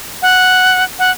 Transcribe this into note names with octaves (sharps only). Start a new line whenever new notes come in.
F#5
F#5